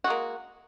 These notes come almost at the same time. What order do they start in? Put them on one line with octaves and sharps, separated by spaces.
F#4 G#3 A#3